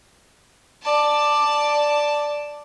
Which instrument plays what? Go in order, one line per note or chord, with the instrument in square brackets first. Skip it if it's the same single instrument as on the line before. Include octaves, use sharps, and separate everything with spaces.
[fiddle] D5 A5